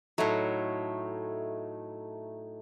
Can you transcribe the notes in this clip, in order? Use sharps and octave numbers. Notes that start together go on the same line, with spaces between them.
A2 F#3 A3 D#4